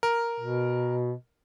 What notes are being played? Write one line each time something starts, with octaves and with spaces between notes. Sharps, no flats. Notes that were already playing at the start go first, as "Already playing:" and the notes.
A#4
B2